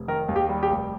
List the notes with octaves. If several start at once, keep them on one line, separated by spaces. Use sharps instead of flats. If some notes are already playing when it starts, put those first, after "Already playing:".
Already playing: F1
D#3 A#4
D#2
G4
G3
G4
F1